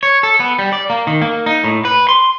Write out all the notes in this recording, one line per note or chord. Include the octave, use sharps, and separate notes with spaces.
C#5
A4
B3
G3
D5
A#3
D#3
A#3
D#4
A2
B4
C6